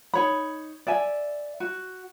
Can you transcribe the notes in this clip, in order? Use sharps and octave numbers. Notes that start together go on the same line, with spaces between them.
D#4 C#5 B5
D5 E5 G#5
F#4